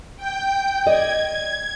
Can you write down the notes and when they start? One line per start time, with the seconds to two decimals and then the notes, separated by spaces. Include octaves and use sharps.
0.17 G5 G6
0.86 D5 D#5 G#6